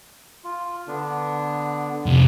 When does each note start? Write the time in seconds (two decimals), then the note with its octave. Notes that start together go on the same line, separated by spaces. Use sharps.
0.44 F4
0.87 D3 B3 D4
2.06 F2 C3